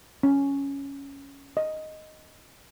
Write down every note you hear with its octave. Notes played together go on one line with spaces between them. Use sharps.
C#4
D#5